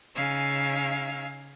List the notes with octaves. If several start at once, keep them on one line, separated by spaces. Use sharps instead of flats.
C#3 D#4 F5 G#5 E6 F6